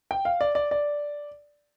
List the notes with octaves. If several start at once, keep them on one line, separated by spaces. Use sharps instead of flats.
G5
F5
D5
D5
D5